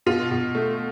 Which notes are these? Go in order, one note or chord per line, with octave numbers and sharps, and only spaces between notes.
B2 F4
B2
A3